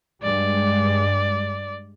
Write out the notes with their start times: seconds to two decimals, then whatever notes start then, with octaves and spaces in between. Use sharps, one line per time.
0.23 G2 G#3 D5